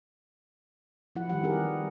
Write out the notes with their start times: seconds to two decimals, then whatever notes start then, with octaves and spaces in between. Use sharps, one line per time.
1.16 F3 E4 F#5
1.30 D#3 E3 G3 G4 F#5
1.43 C4 G4 G#4 A#4